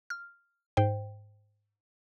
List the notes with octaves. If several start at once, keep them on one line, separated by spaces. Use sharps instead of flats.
F6
G#2 C5 G5